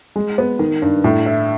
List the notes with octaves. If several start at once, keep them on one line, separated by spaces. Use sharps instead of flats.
G#3
B3
D#3
G2
A2
E4